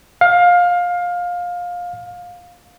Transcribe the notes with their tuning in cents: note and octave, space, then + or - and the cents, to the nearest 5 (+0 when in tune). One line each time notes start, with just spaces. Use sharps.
F5 +20